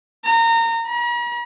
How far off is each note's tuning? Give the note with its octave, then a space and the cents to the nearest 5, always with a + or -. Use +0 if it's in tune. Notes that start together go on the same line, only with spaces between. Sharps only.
A#5 -25
A#5 +45